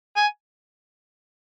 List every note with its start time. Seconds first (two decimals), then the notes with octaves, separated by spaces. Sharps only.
0.16 G#5